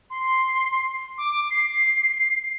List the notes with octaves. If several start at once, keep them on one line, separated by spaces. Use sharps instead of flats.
C6
D6
C7